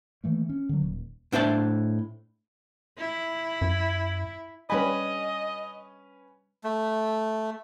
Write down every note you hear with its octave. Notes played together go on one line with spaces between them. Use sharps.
D#3 E3 A3 A#3
C#4
D3 F#3
D#1
A2 D4 C5 E5 A5
E4
F#2
G3 C#4 B4 D#5 G#5 B5
A3